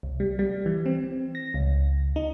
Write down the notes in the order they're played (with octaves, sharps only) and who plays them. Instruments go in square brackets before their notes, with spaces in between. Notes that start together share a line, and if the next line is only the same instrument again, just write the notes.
[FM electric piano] C2
G3
G3
E3
C4
A#6
C#2
D#4